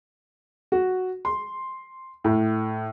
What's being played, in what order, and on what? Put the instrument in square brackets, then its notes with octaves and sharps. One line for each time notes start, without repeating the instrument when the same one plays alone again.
[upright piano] F#4
C6
A2